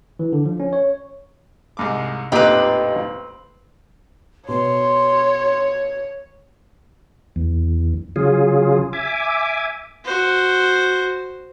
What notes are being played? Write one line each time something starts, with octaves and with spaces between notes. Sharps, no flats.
E3
D3
F3
C#4
C#5
C2 G#2 D6
A1 F2 A#2 C4 D#4 G4 B4 D#5
B2 C#5 C6
E2
C#3 F#3 F4 G#4
E5 G#5 D6
F#4 C5